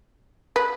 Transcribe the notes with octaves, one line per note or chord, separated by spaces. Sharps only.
B4